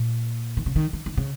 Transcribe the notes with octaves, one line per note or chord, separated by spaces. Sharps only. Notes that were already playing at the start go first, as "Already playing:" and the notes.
Already playing: A#2
D#3
C#3
D#3
D#3
D#3
C#3